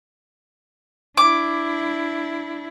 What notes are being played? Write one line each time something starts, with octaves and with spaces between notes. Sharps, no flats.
D4 E4 D6